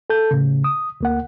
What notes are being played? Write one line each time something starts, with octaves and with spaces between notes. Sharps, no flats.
A4 A5 G6
A2 C#3
D#6
D2 A#3 F#5